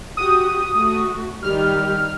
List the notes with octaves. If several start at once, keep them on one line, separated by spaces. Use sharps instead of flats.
F#4 G4 D#6
A3 F#4
D#3 G3 G4 F6